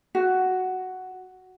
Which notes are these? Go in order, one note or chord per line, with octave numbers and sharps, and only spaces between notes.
F#4